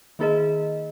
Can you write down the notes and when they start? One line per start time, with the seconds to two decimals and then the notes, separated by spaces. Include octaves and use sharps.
0.19 D#3 A#3 D#4 G#4 A#4 D#5